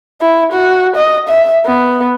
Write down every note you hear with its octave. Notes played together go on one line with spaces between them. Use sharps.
E4
F#4
D#5
E5
B3